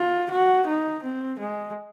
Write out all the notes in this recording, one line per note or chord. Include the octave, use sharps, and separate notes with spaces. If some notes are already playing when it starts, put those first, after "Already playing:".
Already playing: F4
F#4
D#4
C4
G#3